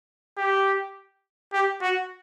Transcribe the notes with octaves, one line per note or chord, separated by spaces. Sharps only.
G4
G4
F#4